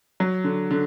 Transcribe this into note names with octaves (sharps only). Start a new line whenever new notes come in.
F#3
D3
D3